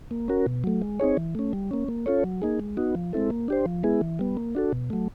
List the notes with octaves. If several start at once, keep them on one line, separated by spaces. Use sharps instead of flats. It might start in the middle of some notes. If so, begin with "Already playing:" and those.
A#3
C#4 F#4 A#4
B2
F#3 A3
G#3
C4 D#4 G#4 C#5
E3
A3 C#4
G3
A#3 C#4
A#3
C#4 F4 A4 C#5
F#3
A#3 D#4 G#4
G#3
B3 D#4 F#4
F3
G#3 C4 E4 A4
A#3
D4 G4 C5
F3
G#3 B3 E4 G#4
E3
G3 B3
A#3
D4 F#4 A4
B2
F#3 A3